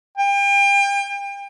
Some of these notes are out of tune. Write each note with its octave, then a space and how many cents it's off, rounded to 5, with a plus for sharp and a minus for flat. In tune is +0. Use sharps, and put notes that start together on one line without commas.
G5 +35